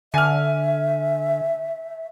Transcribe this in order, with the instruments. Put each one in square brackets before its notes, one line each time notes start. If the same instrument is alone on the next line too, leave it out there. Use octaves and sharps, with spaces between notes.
[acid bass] D3 [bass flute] E5 [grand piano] G#5 F6